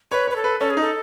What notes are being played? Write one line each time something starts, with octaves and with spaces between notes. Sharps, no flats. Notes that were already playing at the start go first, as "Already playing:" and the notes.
B4 C#5
B4 C#5
A4
B4
C#4 A4
G#4
D#4 A4